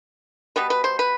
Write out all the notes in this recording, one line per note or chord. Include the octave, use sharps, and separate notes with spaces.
B2 G3 B3 B4
B4
C5
B4